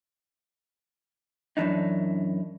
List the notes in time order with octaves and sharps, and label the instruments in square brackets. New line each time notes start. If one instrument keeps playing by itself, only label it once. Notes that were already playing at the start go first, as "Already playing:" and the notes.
[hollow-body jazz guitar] F#2 A2 E3 D4 D#4